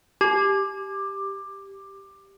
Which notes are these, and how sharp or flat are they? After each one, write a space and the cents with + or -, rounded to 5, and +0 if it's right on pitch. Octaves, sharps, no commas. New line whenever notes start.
G4 +0 D6 +15